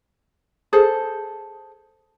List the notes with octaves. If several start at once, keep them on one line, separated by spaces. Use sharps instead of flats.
G#4 A4 C5